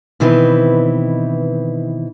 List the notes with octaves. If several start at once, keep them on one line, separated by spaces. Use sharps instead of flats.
B2 D#3 E3 C4 E4 B4